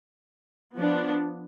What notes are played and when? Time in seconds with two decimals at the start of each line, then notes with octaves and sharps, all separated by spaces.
0.78 F3 B3 D4